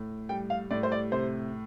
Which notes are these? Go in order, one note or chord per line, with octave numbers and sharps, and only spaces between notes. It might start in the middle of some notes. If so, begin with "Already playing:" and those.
Already playing: A2
G3 G5
F5
A2 D5
C5
D5
C3 C5